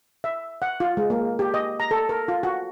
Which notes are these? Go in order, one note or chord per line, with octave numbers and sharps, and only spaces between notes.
E5
F#5
F4
G#3
A#3
G4
D#5
A#5
A4
A#4
F4
F#4